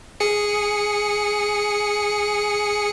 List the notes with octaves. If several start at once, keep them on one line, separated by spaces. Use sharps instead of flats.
G#4 C#7